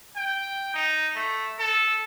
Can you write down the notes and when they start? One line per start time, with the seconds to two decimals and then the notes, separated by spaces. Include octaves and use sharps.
0.16 G5
0.74 D#4
1.16 A3
1.59 A4